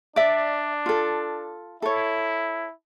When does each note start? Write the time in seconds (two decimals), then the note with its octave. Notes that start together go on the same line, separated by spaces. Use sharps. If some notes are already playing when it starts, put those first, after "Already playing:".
0.16 D4 D5 E5
0.86 F4 A4
1.82 E4 A4 C#5